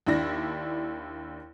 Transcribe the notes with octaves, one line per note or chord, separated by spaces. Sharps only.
D#2 D4 E4 A#6